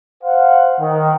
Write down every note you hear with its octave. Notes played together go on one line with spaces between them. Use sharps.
C5 F5 F#5
D#3